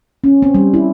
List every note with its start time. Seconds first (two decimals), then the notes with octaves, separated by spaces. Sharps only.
0.24 C#4
0.42 C4
0.55 G3
0.74 E4